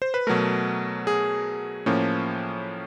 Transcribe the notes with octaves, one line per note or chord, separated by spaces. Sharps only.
C5
B4
B2 F#3 A3 A#4
G#4
A2 F3 A#3 C#4